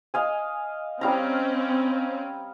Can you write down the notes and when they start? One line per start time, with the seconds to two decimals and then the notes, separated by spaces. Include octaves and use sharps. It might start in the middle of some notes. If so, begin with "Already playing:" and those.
0.14 D#5 F5 G#5
1.01 G3 C4 C#4 F5 A#5